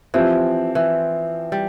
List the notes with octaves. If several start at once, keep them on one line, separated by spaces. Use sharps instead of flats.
E3 F3 C4 G4
E3
G3